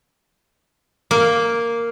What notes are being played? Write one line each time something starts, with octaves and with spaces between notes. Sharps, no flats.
A#3